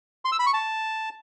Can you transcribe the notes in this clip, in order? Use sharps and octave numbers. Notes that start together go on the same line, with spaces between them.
C6
E6
B5
C#6
A5